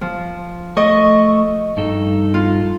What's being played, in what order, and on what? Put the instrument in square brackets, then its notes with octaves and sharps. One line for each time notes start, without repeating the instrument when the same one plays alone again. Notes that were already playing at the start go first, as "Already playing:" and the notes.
[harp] F3
[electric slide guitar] A3 [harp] D#5 C#6
[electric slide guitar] G2 D#4 A4
[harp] F4